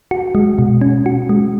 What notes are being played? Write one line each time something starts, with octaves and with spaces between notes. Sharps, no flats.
F#4
G#3
B2
C#4
F#4
G#3